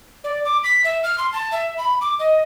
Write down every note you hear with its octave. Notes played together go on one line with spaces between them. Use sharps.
D5
D6
B6
E5
F6
C6
A5
E5
B5
D6
D#5